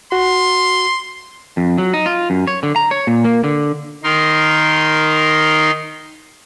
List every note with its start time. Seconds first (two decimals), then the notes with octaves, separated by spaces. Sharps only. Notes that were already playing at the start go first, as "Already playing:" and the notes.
0.12 F#4 C6
1.57 F2
1.78 F#3
1.94 D#4
2.06 F4
2.30 F#2
2.47 C#5
2.63 D3
2.76 A#5
2.91 C#5
3.07 A#2
3.24 A#3
3.44 D3
4.04 D#3 D#4 A#4 C6